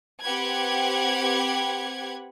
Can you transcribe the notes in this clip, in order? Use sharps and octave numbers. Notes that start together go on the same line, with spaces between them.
C4 G4 B4 F#5 B5 G#6